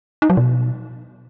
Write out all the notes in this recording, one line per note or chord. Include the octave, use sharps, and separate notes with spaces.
D#4
F#3
B2